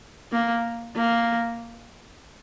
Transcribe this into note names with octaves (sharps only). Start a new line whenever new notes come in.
A#3
A#3